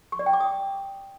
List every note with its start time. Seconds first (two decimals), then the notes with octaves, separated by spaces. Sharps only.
0.12 C#6
0.19 D5
0.26 G5
0.33 D6
0.40 D#6